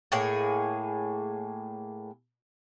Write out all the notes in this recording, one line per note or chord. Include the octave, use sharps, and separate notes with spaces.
A2 A#3 G#4 C#5